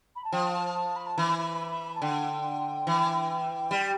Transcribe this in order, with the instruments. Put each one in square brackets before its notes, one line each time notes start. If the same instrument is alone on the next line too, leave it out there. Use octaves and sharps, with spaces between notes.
[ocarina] B5
A5
[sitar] F3 [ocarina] G5
[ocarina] A5
A5
B5
A5
[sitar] E3 [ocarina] B5
[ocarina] A5
[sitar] D3 [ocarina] G5
[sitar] E3
G3